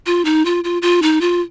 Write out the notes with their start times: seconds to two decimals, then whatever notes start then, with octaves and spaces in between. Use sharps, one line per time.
0.06 F4
0.25 D#4
0.45 F4
0.64 F4
0.82 F4
1.02 D#4
1.21 F4